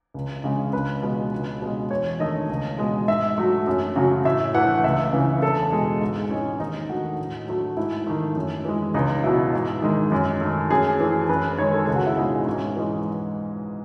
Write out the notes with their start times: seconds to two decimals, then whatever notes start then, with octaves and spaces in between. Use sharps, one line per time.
0.14 C#2
0.44 C#3 G#3
0.73 C#2 B4
1.03 B2 G#3
1.32 C#2
1.62 B2 G#3
1.91 E2 C#5
2.20 D#3 A3 D#5
2.49 C#2
2.78 B2 G#3
3.08 G#2 E5
3.38 F#3 A3
3.67 F#2
3.96 C#3 F#3 A3
4.25 A2 E5
4.54 E3 A3 F#5
4.84 C#2 E5
5.13 C#3 E3
5.42 E2 A4
5.72 B2 G#3 G#4
6.01 G#2 D#4
6.30 E3 G#3 C#4
6.60 D#2 D#4
6.89 D#3 A3 F#4
7.19 A2
7.48 F#3 A3
7.77 G#2 E4
8.07 D#3 A3
8.36 F#2
8.65 E3 G#3
8.94 C#2 D#4
9.24 B2 F#3 E4
9.53 G#2
9.82 D#3 G#3
10.12 F#2
10.41 D#3 A3
10.71 F#2 G#4
11.00 E3 A3 G#4
11.29 F#2 B4
11.58 D#3 G#3 C#5
11.74 A4
11.85 C#2 G#4
11.96 F#4
12.06 E4
12.17 B2 G#3 D#4
12.46 G#2 C#4
12.76 E3 G#3